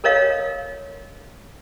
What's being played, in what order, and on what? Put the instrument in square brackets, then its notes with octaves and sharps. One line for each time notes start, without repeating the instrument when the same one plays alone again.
[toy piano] A4 A#4 C#5 D#5 F5